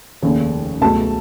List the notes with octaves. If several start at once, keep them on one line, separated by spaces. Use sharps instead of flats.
F1 D#2 C#3
C#2 B2 F#3 A3 A5